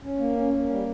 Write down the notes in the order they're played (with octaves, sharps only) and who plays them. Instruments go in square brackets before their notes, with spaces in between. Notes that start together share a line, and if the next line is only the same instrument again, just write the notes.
[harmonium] C#4
A#3
C#4
A#3
G3